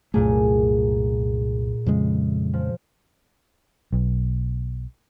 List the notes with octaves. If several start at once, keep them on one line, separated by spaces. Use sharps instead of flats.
C2 F#2 A#2 A3 G#4
F2 C#3 G#3
F3
B1